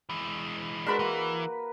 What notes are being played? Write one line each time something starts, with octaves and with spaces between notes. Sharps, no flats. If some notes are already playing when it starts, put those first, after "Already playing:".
E3 G#3
G#3 D4 F#4 A#4 B4 E5 B5
E3 A#3 F#4